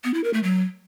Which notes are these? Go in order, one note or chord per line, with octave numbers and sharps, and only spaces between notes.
B3
E4
A#4
A3
F#3